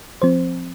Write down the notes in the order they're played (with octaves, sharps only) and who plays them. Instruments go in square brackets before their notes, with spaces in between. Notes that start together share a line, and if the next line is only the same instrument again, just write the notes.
[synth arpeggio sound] F3 C4 C5